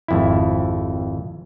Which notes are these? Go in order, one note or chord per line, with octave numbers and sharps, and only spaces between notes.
G#1 F2 E4